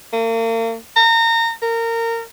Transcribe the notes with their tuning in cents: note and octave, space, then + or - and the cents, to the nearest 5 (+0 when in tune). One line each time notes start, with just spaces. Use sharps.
A#3 -40
A#5 -30
A#4 -25